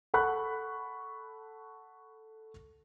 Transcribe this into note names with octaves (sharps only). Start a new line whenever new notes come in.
A4 F#5 B5 C#6 F#6